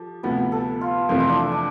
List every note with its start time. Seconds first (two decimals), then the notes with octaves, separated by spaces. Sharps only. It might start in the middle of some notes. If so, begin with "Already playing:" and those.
Already playing: F3 G4 A4
0.23 D2 C3 F3 B3 B4
0.52 A4
0.81 F4
1.09 F2 C3 E3 A3 F4
1.20 E4
1.29 D4
1.39 E4
1.52 D4